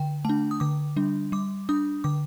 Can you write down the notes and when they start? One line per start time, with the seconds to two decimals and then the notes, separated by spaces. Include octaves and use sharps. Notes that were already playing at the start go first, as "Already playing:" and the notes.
Already playing: D3 G5
0.25 A3 D4 A5
0.51 D#6
0.60 D3 D6
0.96 G3 D4
1.32 G3 D6
1.69 D4 D#6
2.04 D3 D6